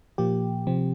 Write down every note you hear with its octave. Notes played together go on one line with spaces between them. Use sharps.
A#2 F3 A#3 G4
C3 F3 C4